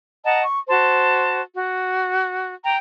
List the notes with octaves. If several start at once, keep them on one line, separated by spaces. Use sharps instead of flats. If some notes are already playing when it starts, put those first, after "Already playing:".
D#5 F#5 A5 A#5
C#6
F#4 C5 A5
F#4
G5 A#5